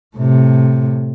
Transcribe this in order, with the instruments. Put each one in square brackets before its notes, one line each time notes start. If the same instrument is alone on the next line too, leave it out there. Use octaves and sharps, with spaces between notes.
[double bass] A2 C3